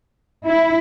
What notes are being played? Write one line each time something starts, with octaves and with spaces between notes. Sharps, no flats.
E4